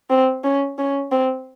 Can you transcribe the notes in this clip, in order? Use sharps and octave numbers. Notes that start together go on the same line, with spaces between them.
C4
C#4
C#4
C4